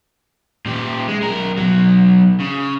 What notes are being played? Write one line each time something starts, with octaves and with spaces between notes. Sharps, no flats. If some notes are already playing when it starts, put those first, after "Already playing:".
A#2 G4
G#3
B1 A#4
B1 F#3
C#3